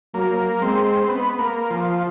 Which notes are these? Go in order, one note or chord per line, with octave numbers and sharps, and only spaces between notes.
F#3 A#3
G#3 C4
C4
B3
A#3
F3